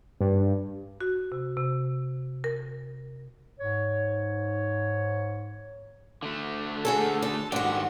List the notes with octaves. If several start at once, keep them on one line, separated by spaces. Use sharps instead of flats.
G2
F#4
C3
C3
A#4
G#2 C#5
D3 A3
F#4 G#4 A4
A4
G#2 D#3 D4 F#4 G4